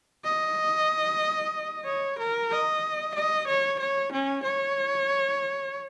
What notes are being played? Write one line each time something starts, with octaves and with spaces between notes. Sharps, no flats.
D#5
C#5
A#4
D#5
D#5
C#5
C#5
C#4
C#5